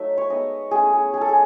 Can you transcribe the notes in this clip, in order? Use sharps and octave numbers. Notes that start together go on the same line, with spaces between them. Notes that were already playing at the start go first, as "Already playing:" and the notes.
Already playing: F#3 A3 D#4 E5
C#5
G#3 B3 D#4 D#5
A3 C#4 E4 G#4
G#4
G#3 D#4 G#4
A4
G#4